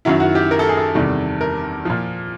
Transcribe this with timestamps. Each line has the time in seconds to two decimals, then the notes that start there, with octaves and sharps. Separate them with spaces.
0.05 F#2 D#3 F#3 E4
0.20 F#4
0.35 G4
0.51 A#4
0.59 A4
0.69 G#4
0.77 A4
0.95 E2 C3 D#3 G3
1.41 A#4
1.85 A#2 F3